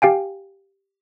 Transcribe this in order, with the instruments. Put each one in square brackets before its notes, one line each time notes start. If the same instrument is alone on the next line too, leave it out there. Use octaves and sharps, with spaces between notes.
[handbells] G4 F5 G5 G#5